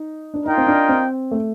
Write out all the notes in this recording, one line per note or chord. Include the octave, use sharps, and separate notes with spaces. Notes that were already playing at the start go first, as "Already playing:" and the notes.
Already playing: D#4
D4
D#4 F4 A#4 D#5 G5
C4
D4
C4
A3